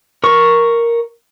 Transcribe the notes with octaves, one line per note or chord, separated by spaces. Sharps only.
A#4 C#6